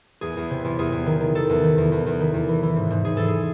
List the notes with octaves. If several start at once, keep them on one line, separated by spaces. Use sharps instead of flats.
E2 G#4
E2
C3
E2
E2 G#4
E2
D#3
D#3
D#3 A4
E2
D#3
E2
E2
E2
D#3
E2
E3
E3
G#2
G#2
G#2 G#4
E3 A4
G#4